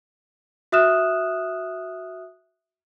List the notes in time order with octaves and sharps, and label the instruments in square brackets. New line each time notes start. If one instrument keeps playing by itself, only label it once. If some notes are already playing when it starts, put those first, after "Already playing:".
[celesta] F#4 E5 D#6 F6 F#6 E7